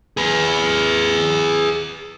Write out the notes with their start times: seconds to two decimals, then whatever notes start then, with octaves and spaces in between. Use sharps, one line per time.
0.17 G#4 B4